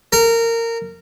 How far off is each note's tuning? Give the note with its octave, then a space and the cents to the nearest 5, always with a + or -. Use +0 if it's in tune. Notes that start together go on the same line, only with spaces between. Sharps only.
A#4 -20